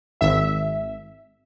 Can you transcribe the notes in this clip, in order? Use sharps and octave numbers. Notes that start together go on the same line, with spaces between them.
G#1 E5